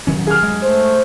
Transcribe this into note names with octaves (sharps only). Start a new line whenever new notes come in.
D#1 D#3 F#3 C#4
G#4 F6
G2 G#3
A3 C5